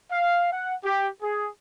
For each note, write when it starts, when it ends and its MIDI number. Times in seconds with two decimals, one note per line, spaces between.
0.10 0.51 77
0.51 0.74 78
0.83 1.07 67
1.22 1.48 68